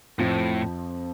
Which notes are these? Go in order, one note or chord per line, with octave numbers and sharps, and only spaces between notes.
F2 A2 F3